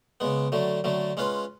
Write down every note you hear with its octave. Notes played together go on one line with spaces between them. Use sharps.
C#3 G#3 B3
D3 F#3 A3
D3 F#3 A3
G#3 C#4 F4 B4